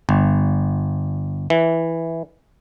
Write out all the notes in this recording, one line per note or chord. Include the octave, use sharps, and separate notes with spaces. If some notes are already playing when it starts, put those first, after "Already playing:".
G1
E3